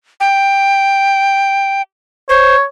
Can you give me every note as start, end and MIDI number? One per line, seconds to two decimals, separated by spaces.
0.20 1.82 79
2.29 2.55 72
2.29 2.64 73